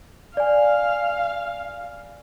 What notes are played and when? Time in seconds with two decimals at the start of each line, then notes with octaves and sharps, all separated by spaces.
0.37 D5 F5 G#5